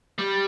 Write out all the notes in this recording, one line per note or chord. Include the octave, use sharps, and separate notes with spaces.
G3